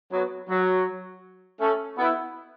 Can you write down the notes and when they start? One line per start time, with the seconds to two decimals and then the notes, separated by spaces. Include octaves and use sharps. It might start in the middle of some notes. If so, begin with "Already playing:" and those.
0.12 F#3 B3
0.50 F#3
1.61 A3 C#4
1.99 B3 E4